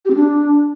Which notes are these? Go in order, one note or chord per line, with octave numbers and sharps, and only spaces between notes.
G4
C4
D4